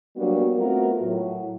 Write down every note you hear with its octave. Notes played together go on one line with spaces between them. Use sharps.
F#3 G3 A#3 B3 D4 F#4
A3 B3 C4 F4 F#4 A#4
A2 F#3